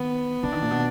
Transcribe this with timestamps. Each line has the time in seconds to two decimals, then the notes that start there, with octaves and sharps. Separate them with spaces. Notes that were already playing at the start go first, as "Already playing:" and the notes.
Already playing: D#3 B3
0.43 D3 D4
0.52 D#3
0.62 A#2
0.71 B2